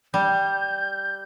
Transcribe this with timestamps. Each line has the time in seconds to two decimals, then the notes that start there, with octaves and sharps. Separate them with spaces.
0.14 G3 G6